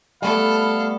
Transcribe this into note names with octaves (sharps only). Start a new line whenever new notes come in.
G3 A3 B3 A4 F5 B5